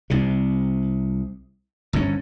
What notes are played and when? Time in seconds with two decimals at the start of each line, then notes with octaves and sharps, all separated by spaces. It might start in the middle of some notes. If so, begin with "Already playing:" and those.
0.10 C2 C3
1.93 G1 G#2 C#4